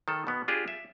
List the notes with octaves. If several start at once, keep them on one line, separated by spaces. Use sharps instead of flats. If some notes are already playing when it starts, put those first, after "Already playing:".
D#3 A4
B2 B3
D4 F4 G4 G#4
E5